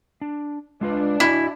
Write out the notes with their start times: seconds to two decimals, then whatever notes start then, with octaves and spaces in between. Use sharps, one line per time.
0.21 D4
0.81 G#3 D4 F4 B4
1.20 E4 F#4 D#5 G#5